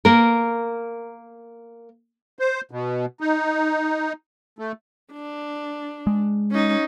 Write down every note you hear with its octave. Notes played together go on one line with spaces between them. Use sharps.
A#3 A#4
C5
B2
D#4
A3
D4
G#3
C#4 D#4